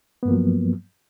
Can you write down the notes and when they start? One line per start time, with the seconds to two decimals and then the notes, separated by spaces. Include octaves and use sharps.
0.23 B3
0.25 G2
0.28 A#3
0.31 F3
0.33 F#3